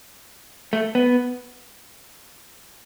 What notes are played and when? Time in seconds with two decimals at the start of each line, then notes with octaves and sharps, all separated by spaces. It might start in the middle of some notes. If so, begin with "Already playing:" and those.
0.73 A3
0.95 B3